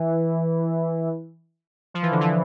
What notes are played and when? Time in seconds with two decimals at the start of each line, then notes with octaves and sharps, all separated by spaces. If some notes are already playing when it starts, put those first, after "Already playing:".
Already playing: E3
1.94 F3
2.03 E3
2.12 D3
2.21 E3